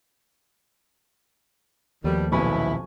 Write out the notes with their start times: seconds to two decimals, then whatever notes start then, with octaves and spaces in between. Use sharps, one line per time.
2.04 D#2 B2 D#3 F3 G3 A3
2.32 D#1 B1 B3 E4 G#5 B5 C#6